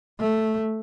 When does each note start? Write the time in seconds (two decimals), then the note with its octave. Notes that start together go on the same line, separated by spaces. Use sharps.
0.20 A3